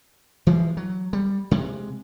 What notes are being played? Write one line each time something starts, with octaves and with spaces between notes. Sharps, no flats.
E3 F3 G#3
F#3
G3
C3 G#3